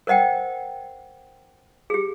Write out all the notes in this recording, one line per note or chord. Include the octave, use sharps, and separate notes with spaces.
A#4 C5 D#5 F#5 G5
G4 G#4